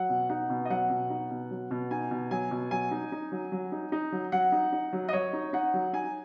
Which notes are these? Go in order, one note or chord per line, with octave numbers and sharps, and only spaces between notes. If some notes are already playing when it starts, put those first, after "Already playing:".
Already playing: F#3 F#5
B2
D#4 F#5
B2
D#5
F#3 F#5
B2
D#4
B2
F#3
B2
D#4 G#5
B2
F#3 G#5
B2
F#3 G#5
D#4
D#4
F#3
F#3
D#4
D#4
F#3
F#3 F#5
D#4
D#4
F#3
D#5
F#3 C#5
D#4
D#4 F#5
F#3
D#4 G#5